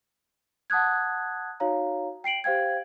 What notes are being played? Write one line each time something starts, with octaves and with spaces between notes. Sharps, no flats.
F#5 A5 D#6 F#6 G#6
D#4 F#4 C#5 F5 A#5
G5 C7 D7 F#7
G4 C5 F5 G5 G#6